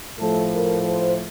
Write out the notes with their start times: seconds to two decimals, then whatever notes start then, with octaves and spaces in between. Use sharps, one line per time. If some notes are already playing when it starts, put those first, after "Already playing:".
0.19 A2 F3 A3 A4
0.55 A#4
0.89 C5